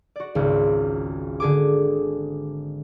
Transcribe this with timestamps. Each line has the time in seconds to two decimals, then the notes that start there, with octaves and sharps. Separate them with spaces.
0.16 F#4 D5
0.35 G#1 C#2
1.40 D3 G#4 D6